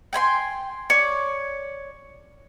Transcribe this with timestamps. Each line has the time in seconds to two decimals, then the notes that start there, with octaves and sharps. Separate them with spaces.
0.13 G5 G#5 B5 C6
0.90 C#5 D5